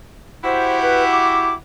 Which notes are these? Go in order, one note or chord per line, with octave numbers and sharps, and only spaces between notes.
E4 F#4 G4 C5
B4
D6